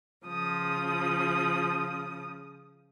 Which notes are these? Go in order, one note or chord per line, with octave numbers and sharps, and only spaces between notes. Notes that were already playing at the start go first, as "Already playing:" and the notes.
C#3 F3 D#6